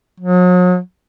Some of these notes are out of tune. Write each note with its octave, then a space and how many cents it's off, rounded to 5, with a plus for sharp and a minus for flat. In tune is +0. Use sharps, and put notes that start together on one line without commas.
F#3 -40